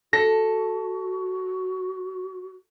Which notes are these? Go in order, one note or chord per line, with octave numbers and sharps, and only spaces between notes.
F#4 A4 A#6